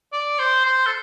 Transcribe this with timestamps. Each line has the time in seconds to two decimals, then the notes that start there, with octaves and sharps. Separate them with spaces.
0.13 D5
0.39 C5
0.65 C5
0.86 A4